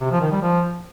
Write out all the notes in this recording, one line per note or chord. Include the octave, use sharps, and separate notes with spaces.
C3
F3
D#3
G3
F3